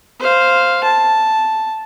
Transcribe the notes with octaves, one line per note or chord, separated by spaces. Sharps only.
C5 F5
A5